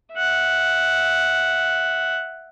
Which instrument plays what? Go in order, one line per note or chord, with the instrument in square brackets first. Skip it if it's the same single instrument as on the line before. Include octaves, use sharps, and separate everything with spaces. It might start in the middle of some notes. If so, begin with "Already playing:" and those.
[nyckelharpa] E5 F#5